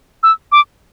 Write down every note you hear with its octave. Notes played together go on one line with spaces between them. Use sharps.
E6
D6